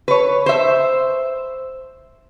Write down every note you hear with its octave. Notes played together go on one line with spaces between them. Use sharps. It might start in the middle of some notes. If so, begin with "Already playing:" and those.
B4 C#5
C5 E5